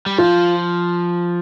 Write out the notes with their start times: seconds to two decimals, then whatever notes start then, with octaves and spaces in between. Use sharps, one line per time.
0.06 G3
0.18 F3 F4